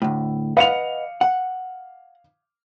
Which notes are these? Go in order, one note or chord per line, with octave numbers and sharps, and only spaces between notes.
D2 A2
B4 D#5 F5 F#5 C#7 F7
F#5